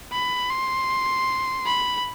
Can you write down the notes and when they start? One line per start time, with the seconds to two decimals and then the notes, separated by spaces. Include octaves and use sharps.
0.12 B5
0.50 C6
1.66 B5